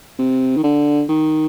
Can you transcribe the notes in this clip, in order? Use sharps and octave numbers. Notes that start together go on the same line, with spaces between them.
C3
D#3
D3
D#3